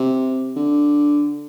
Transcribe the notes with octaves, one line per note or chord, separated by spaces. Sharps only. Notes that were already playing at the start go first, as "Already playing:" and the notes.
Already playing: C3
D3